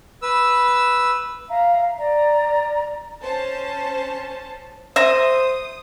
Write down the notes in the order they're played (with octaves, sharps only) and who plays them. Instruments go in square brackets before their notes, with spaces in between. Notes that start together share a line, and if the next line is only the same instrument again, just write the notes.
[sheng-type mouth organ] B4 E6
[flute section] E5 F5 A#5
D5 A#5
[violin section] C#4 C5 A5
[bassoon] C5 [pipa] E5 A#5 [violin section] D#6